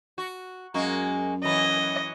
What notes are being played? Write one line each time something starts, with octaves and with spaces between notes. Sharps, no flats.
F#4
F#2 G#3 A#3 F#4
E3 F#3 B3 D#5